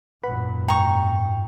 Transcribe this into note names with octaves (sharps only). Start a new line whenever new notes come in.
G#1 F#2 A#2 B4 F#5 B5
G#2 G5 A#5 C#6